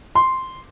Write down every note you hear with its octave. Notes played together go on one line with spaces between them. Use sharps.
C6